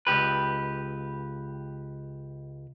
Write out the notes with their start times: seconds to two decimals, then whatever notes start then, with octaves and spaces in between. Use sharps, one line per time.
0.07 C#2 F#2 G4 B4